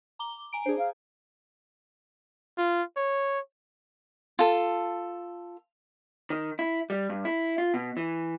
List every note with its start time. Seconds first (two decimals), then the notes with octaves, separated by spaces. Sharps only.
0.19 A#5 D6 G7
0.53 G#5 A#5 D7
0.66 D4 G#4 C5
0.78 F5
2.58 F4
2.97 C#5
4.39 F4 A4
6.30 D#3
6.59 E4
6.90 G3
7.09 G2
7.25 E4
7.58 F4
7.74 B2
7.97 E3